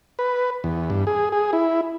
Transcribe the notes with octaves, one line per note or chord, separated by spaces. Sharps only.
B4
E2
G2
G#4
G#4
E4